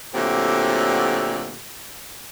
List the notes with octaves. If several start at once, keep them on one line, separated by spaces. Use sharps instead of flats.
A#2 D3 F#3 A3 C4 G4